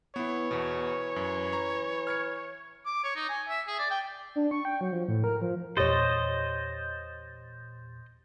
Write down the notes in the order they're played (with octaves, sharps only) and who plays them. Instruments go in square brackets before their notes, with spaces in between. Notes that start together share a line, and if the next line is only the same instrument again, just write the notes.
[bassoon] E3 [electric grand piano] B3 E4 [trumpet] C#5
[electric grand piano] E2 B2
F#2
A#5 C#6
F6 G#6 C#7
[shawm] D6
C#5
D#4
G#5
E5
G#4
D5
G5
[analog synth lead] D4
C#6
G5
F#3
F3
A2
A#4
F3
[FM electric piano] E2 A#2 A6 [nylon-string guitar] G4 C#5 [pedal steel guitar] C5 D#5